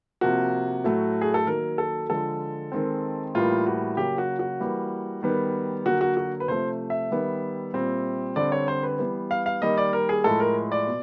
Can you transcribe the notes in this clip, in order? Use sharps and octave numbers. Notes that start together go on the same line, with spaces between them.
C3 F3 A#3 F#4
A2 F#3 A3
G#4
A4
D#3 F#3 A#3 A#4
A4
D3 F3 G#3 A4
D#3 G#3 C4
A2 E3 G3 A#3 F4
F#4
C#3 F#3 A#3 G4
F#4
F#4
E3 G3 A#3
D#3 G3 B3
D3 F#3 A#3 F#4
F#4
F#4
B4
C3 F3 A3 C5
E5
D#3 G3 B3
A#2 G3 C4
D3 G3 C4 D5
C#5
C5
B4
E3 G3 B3
F5
F5
D#3 G3 A#3 D#5
D5
A#4
G#4
A2 F3 G#3 A4
A#4
D5
B2